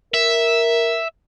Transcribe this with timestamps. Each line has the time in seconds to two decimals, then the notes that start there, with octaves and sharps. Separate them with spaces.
0.14 A#4 E5